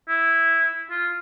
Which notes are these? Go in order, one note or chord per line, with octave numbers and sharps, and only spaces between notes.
E4
F4